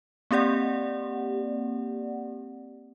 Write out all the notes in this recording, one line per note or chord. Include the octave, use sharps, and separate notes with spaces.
A#3 C4 G4 D5 F#5